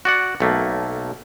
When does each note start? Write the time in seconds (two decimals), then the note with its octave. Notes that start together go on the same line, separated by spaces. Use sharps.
0.05 F#4 D5 F#5
0.40 B1 A3 A#3